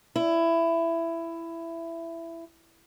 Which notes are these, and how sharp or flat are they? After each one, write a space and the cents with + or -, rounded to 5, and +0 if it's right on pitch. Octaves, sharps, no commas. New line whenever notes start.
E4 +15